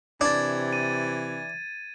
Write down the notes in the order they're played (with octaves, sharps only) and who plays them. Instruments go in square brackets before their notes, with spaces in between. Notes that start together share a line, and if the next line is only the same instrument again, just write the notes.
[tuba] C3 [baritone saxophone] E3 [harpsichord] D4 [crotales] G#6 A6
[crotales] D#7